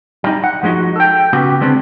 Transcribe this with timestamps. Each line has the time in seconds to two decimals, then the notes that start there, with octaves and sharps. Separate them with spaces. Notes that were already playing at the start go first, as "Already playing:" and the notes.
0.24 G3 D#4
0.44 F#5
0.63 F3 G#3 C#4 D#4 F#4
0.96 A4 G5
1.33 C#3 B3 F#4 G4
1.61 D3 G#3 B3 C4 D4